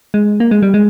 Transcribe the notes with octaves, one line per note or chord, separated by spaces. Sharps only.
G#3
A#3
G#3
G3
G#3